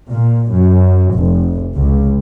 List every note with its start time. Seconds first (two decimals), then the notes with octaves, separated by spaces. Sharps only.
0.10 A#2
0.51 F#2
1.15 F1
1.73 C#2